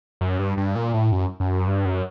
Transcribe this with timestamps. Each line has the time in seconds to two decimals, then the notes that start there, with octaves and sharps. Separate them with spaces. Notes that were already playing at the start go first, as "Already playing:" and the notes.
0.21 F#2
0.39 G2
0.57 G2
0.76 A#2
0.94 A2
1.12 F#2
1.40 F#2
1.67 G2
1.85 F#2